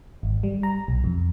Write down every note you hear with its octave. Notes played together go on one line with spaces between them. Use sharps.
G#1
G3
A#5
B1
F2